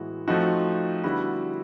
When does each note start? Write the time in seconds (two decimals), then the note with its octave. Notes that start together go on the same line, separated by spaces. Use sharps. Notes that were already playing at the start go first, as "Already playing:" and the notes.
Already playing: A2 E3 G#3 B3 F#4
0.27 F3 A3 C4 D#4 F#4
1.04 D3 G3 B3 E4 F#4